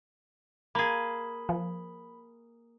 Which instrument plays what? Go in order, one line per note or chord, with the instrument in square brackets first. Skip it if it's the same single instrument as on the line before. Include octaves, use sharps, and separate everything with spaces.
[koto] A#3 G#4 [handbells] B5
[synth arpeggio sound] F3